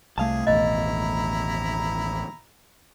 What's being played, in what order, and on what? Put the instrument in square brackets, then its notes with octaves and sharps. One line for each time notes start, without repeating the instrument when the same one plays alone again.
[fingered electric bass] C2 [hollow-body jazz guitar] A3 F5 A5 [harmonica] G#4
[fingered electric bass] A1 D#2 B2 [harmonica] E4 A#5 [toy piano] D#5